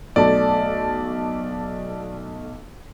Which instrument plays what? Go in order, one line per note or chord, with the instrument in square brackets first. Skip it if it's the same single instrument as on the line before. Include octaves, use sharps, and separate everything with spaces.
[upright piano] B1 A3 A5 [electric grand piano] D5